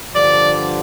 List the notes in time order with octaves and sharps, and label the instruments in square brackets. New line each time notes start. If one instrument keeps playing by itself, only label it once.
[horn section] G2 D3 F3 D5